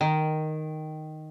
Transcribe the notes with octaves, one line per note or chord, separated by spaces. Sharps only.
D#3